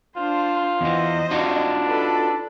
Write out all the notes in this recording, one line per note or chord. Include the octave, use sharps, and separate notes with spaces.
D4 F4 C5
E2 E3 C5 D#5
D4 D#4 F4 F#4
A4 B4